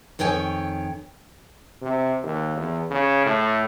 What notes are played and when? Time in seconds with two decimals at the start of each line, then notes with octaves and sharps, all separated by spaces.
0.19 F2 D#3 C#5 G5 G#5
1.82 C3
2.23 D#2
2.57 E2
2.91 C#3
3.26 A2